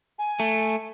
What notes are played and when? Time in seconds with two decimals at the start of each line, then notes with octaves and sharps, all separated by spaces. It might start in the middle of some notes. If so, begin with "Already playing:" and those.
0.19 G#5
0.40 A3